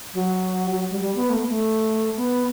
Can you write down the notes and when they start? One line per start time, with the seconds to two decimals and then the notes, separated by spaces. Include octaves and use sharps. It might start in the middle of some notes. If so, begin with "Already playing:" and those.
0.14 F#3
0.71 F#3
0.90 G3
1.01 G3
1.15 B3
1.30 A3
1.39 B3
1.49 A3
2.17 B3